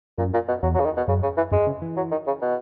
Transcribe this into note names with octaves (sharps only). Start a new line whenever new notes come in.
F#2 A#2
A#2
B2
E2 F#3
F#3
C#3
D#3
B2
F#2 C#3
C#3
E3
F#2 G#3
C#3
E3
F#3
D#3
C#3
B2